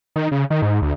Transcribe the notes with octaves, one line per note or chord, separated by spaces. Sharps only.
D#3
C#3
D#3
G#2
D2